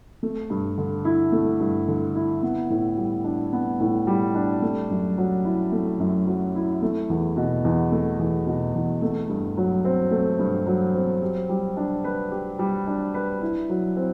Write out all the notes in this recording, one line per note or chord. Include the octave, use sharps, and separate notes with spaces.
A3
G2
D3
E4
A3
G2
D3
E4
B3
A2
G3
D4
B3
A2
G3
D4
A3
F#2
F#3
E4
A3
F#2
F#3
E4
A3
E2
B2
E2
A3
E2
B2
E2
A3
G2
F#3
C4
A3
G2
F#3
C4
G4
G3
D4
B4
G4
G3
D4
B4
E4
F#3
C4